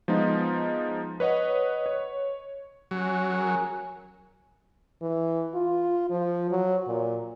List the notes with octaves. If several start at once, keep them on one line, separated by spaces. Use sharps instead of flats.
F3 G#3 B3 D#4 F4
B4 C#5 D#5 F#5
C#5
F#3 C#4
G#4 A#4
E3
F4
F3
F#3
A#2